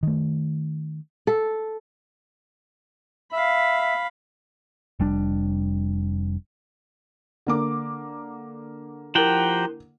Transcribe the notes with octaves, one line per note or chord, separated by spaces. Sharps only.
D#3 A3
A4
E5 F5 B5
F1 G3 D4
D3 A#3 D6
F3 E4 G4 A#4 F#5 G5 A#5